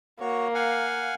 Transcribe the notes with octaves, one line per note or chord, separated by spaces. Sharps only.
A#3 F#4 C#5
F5 F#5 G#5